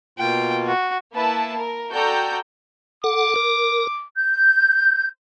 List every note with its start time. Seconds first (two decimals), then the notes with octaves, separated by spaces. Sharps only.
0.19 B2 A#3 F4 G5
0.66 F#4
1.14 A#3 E4 B4 A5
1.55 A#4
1.92 F#4 A4 D5 G5 A#5 G6
3.04 A4 F#5 D6
3.36 A#4
4.16 G6